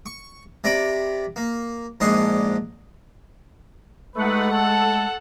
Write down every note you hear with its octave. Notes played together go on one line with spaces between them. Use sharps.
C#6
C3 D5 A#5 B5 D6
A#3
A#1 G#2 D4 D#5 G#5 C6
G#3 A3 D#4 G4 B4 F#5
A4 F#5 A5